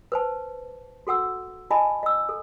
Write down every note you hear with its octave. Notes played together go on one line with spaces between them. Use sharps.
B4 C5 A5
F#4 A4 F#5 E6
E4 D#5 G#5 A5 B5
D#5 E6
A4